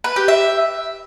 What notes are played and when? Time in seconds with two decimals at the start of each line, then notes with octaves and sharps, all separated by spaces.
0.04 B4
0.16 G4
0.28 E5